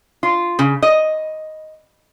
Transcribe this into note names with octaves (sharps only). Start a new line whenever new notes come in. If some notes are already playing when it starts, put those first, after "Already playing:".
F4
C#3
D#5